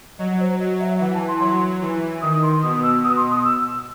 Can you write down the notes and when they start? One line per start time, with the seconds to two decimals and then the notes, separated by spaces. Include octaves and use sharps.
0.19 F#3 D#5
0.40 C5
0.59 F#3 D#5
0.80 E5
1.00 E3 F#5
1.14 A5
1.28 C6
1.40 F#3 C6
1.82 E3
2.22 D#3 D#6
2.43 C6
2.62 B2 D#6
2.83 E6
3.03 B2 D#6
3.17 C6
3.31 D#6
3.45 E6